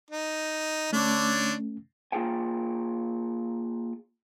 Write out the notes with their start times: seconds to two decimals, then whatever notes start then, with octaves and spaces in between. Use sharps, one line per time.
0.11 D#4
0.93 D3 A3 C#4 D4 C#5
2.12 A#3 F4 G4 G#4 G5 G#5